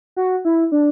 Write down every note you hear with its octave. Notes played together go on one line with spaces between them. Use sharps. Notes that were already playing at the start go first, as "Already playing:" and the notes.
F#4
E4
D4